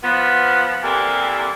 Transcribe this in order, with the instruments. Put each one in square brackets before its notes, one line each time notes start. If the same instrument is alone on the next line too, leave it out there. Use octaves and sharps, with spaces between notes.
[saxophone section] F3 B3
C3 E3 G3 A#3 A4 A#4